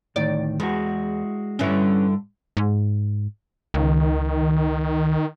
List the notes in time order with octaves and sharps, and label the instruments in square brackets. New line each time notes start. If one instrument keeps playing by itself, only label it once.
[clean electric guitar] D2 A2 D#3 [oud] D5
[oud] E2 [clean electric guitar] G#3 F#4
[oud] G2 D3 E4 [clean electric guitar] C#4 B4 C#5
[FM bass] G#2
[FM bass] C#2 [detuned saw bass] D#3